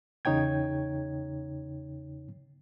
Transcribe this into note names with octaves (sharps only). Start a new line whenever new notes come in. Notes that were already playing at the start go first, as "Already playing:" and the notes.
E2 C#3 D#4 C#5 G5 G#6